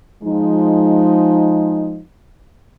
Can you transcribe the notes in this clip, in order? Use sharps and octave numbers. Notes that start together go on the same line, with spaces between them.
F3 G#3 D#4